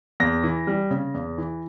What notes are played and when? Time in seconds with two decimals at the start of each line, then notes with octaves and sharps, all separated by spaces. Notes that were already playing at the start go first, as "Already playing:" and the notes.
0.20 E2 A#6
0.43 E3
0.67 G3
0.91 C#3
1.14 E2
1.38 E3